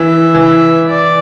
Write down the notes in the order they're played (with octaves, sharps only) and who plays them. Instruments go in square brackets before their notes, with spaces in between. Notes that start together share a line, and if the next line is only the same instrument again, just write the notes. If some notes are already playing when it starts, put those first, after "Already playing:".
Already playing: [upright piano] E3 [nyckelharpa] E5
[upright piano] E3
[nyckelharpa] D5